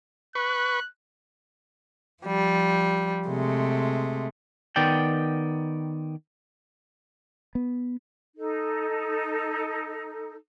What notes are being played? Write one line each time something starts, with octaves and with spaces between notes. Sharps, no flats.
B4 C#6 F#6
F3 G3
C3 G#3 A3
D#3 B3 D5 G5
B3
D#4 A4